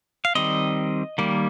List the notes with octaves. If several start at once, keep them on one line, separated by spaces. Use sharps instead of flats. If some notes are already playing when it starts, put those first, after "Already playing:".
F5
D#3 G3 C4 D#5
D#3 G3 A#3